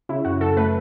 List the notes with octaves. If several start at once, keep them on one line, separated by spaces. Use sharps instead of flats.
C#3 E4
F#2 F#4
F#2 A4
A3 B4